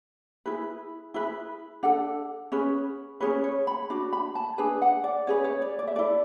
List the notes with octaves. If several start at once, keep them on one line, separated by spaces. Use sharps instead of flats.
E4 G#4 B4
E4 G#4 B4
D4 A4 F#5
C#4 G#4 B4
C#4 E4 G#4 B4 C#5
C#5
B5
D4 F#4
B5
A5
D4 G#4 B4 G#5
F#5
D5
C#4 G#4 B4 C#5
C#5
D5
D5
E5
E4 A4 D5